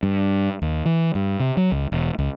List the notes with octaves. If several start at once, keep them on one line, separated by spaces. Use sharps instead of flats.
G2
D#2
E3
G2
C3
F#3
C#2
E1
C#2